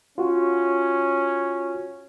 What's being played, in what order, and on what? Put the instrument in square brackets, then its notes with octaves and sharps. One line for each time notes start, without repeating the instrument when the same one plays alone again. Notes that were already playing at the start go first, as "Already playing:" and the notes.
[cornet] C#4 [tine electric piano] F4 F#4